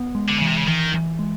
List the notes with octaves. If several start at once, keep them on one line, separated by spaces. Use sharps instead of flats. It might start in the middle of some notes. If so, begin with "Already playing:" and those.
Already playing: B3
G#3
D3
C#3 E3
C3
C#3
D#3 E3
E3
G#3